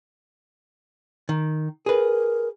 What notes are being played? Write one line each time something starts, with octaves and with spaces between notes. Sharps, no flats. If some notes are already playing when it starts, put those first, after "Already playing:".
D#3
G#4 A#4 B4